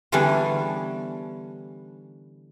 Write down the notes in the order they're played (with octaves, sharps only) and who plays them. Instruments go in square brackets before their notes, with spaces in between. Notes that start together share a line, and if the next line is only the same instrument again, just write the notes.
[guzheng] D3 E3 G3 B3 C#4 D4